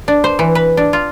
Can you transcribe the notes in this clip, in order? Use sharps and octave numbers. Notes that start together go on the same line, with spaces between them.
D4
C5
E3
B4
D4
F4